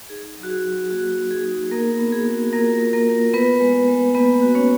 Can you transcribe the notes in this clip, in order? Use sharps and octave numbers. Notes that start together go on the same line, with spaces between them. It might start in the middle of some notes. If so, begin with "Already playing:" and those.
D#4 G#4
F#3
F#4
G#4
F#3
A#3 F#4
D#4
G#4
D#4
A#3 B3 A#4
B3
G#4
F#4
A#3 F4 A#4
A#3
A#3 A#4
F4
B3 B4
G#3
G#3
A#3 B3 B4
F#4
C#4 C#5